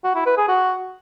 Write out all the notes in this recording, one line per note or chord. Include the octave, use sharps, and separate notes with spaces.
F#4
E4
B4
G#4
F#4